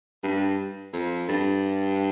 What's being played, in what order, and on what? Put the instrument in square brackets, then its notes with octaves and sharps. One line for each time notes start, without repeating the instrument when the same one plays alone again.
[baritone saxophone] G2
F2
G2